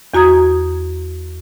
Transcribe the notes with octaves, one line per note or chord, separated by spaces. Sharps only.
E2 F#4 A#5 D#6 G#6